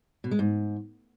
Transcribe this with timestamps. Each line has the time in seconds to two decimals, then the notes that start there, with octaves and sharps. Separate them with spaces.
0.24 B2
0.31 G#3
0.39 G#2